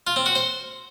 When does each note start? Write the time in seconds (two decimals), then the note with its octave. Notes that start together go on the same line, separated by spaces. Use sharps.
0.07 F4
0.16 C4
0.26 F#4
0.35 C5